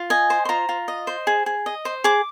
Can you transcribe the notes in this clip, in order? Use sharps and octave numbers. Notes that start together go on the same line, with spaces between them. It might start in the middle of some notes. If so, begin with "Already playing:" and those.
Already playing: F4
D#5 G#5
C5
C6
F4 A#5
F4
D#5
C5
G#4
G#4
D#5
C5
G#4 D6